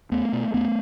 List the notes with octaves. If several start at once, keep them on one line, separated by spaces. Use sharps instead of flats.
E2 A3 B3
B2
E2 A3 B3